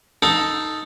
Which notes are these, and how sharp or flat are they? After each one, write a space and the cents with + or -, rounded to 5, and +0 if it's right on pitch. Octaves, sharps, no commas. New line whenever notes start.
D#4 +0 A4 +0 F5 +35